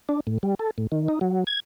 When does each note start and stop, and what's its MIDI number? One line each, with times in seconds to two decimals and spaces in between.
0.09 0.20 62
0.27 0.38 45
0.43 0.55 55
0.59 0.71 69
0.78 0.87 45
0.92 1.08 51
1.08 1.19 63
1.21 1.44 54
1.47 1.60 92